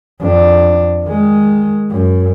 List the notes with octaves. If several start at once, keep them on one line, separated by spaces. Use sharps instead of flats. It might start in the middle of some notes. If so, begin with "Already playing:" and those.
F2 D4
D#3 G#3
F#2